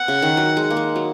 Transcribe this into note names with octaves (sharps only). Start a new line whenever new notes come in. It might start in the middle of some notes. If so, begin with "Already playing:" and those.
Already playing: F#5
C#3
D#3
F#3
G#3
A#3
G#3
F#3